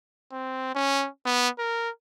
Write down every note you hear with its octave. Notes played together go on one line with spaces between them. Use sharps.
C4
C#4
B3
A#4